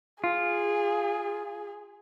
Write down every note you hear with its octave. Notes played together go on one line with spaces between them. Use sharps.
F4 G#4